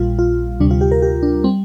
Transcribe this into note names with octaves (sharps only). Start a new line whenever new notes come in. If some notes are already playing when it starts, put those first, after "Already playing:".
Already playing: A#1 A#2 G3 F4
F4
D2 C3 G3 D4
F4
G4
A#4
G4
D4
G3 C4